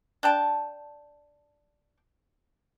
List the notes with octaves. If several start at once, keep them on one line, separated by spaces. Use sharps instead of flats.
D4 G5 A5